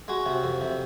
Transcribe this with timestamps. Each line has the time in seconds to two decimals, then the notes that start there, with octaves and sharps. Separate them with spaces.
0.08 G#3 F#4
0.26 C3
0.44 F2
0.61 C3